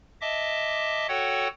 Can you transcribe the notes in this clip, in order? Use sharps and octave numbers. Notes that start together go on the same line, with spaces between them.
D#5 E5 A5 D6
F#4 A4 C#5 F#5 G5